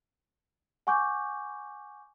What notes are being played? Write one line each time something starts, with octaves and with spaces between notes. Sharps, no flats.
F#5 G#5 C#6 D6 G6